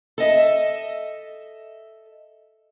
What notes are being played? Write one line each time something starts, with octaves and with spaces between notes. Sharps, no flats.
A4 D#5 E5